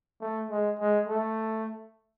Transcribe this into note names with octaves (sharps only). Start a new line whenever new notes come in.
A3
G#3
G#3
A3